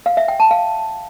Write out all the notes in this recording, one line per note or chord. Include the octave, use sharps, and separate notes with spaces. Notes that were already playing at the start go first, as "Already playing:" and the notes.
F5
E5
G5
A5
F5